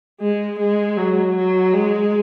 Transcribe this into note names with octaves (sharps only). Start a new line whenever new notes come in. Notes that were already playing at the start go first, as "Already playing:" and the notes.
G#3
G#3
F#3
F#3
G#3